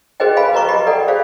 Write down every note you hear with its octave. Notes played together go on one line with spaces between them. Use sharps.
F#4 G#4 B4 C5 D#5 G5
C5 F5 G#5 B5
F#4 B4 D#5 A#5 C#6 D6
G4 D#5 B5
A4 D5 F#5 G5
G#4 C5 D5 F5